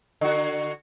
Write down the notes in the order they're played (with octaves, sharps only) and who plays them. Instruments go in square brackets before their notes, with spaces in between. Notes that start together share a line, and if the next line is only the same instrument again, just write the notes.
[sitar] D3 F#4